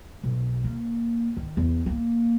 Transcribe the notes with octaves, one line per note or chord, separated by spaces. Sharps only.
B1
A#3
D#3
E2
A#3